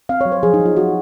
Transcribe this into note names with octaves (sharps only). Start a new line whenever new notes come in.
C4 F5
F#3 C#5
C5
F3 G#4
D#4
F3
F4
F3 F#4